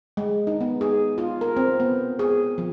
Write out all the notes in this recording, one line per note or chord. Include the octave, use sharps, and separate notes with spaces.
G#3
D#4
B3
G#4
F4
A#4
C4
B3
G#4
F3